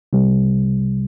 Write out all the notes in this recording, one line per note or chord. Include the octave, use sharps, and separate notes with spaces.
C2 C3 G3